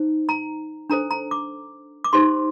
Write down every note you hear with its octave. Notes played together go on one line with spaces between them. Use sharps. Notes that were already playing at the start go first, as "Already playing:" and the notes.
Already playing: D#4 C5
A#5
D4 A4 C5 A#5
A#5
D6
D6
D#4 G4 C5 C6